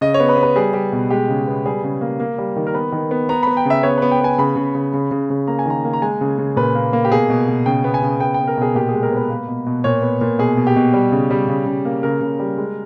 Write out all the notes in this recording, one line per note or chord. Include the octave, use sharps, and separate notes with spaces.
C#3 D#5
C#5
B3
B4
B3
B4
G3 G#4
G3
B2
G#3 G4
C#3
B3
G3 G#4
C#3
A#3
A#3
G3
D#3
A#4
B3 B4
D#3
B3
B3 A#5
B3 B5
G5
C#3 E5
B3 C#5
B3 B4
G5
B3 G#5
C#3 B5
C#3
C#3
C#3
C#3
C#3
A#3 A#5
G#5
D#3 A#5
A#3
A#5
G#3 G#5
C#3
C#3
A#2 B4
A#3
A#3
G4
B2 G#4
B2
B2
C#3 G5
B3
G#5
C#3
B3 G5
B3 G5
A#4
B2 G#4
A#2 G4
G#4
G#3
A#4
B3 B4
A#3
B2
B2
A#2 C#5
B3
A#2
B2 G#4
B2
G4
B2
G3
C#3
G3
C#3
C#3
A#3
C#3 A#4
C#3
G3
G#3